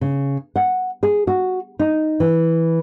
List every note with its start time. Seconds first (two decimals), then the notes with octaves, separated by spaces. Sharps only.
0.01 C#3
0.56 F#5
1.03 G#4
1.27 F#4
1.79 D#4
2.20 E3